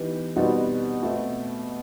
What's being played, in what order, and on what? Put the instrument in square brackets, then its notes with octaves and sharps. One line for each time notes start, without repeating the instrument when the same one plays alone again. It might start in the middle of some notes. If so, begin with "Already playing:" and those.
Already playing: [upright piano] E3 B3 D#4 G4 B4
B2 G3 C4 D#4 F#4
B2 A3 C4